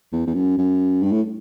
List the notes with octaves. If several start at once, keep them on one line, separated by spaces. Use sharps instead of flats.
E2
E2
F#2
F#2
G2
A2